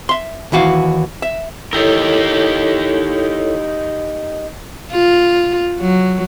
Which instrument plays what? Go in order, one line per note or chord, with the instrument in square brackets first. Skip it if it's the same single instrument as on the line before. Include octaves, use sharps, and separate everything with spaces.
[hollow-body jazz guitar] E5 C6
D#2 E3 F#4 F5
E5
[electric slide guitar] D#4 G4 A#4 [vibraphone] E4 A4 C#5
[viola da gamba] F4
F#3